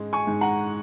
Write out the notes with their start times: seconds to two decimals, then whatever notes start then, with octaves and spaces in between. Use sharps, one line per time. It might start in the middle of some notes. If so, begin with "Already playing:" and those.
Already playing: G#2 G#3 C#4
0.13 G#5 C#6
0.27 G#2
0.41 F#5 A#5